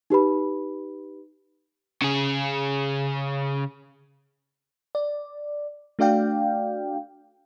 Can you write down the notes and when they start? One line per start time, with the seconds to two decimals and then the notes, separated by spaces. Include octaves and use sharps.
0.10 D#4 G4 B4 B5
2.02 C#3 G#4
4.95 D5
5.99 A3 D4 F#4 D5 F5 G5